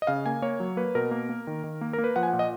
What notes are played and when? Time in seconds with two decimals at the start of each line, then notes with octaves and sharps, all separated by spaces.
0.02 D#5
0.07 C#3 F5
0.26 A#3 G#5
0.42 A#3 C#5
0.60 F#3
0.77 A#3 B4
0.95 B2 A#4
1.11 A#3
1.30 A#3
1.47 D#3
1.64 D#3
1.81 A#3
1.93 A#3 A#4
2.04 B4
2.16 F3 F#5
2.23 G#5
2.28 A#2 F#5
2.39 D#5